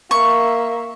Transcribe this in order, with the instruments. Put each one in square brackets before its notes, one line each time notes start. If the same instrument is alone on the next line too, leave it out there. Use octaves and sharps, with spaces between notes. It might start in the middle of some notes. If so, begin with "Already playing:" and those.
[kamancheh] A#3 E5 [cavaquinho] C#6